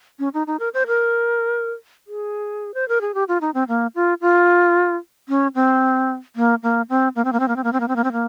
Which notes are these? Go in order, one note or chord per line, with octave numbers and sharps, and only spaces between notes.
C#4
D#4
D#4
A#4
C5
A#4
G#4
C5
A#4
G#4
G4
F4
D#4
C4
A#3
F4
F4
C#4
C4
A#3
A#3
C4
A#3
C4
A#3
C4
A#3
C4
A#3
C4
A#3
C4
A#3
C4
A#3